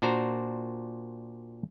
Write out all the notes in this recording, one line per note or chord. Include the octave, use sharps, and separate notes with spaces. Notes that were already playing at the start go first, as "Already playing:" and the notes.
A#2 D4 F#4 C5 A#5